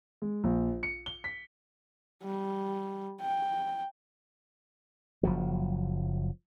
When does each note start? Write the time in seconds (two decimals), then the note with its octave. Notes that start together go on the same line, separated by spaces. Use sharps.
0.22 G#3
0.44 A#1
0.83 C#7
1.06 G7
1.24 B6
2.23 G3
3.21 G5
5.23 F#1 F3 F#3